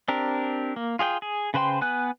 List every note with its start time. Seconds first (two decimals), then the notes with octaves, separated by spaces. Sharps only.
0.08 C4 D4 G4 A#4
0.76 A#3
0.99 F4 G#4 C#5 G5
1.22 G#4
1.54 C#3 B4 C5 G5 C6
1.81 B3 B4 G#5 F#6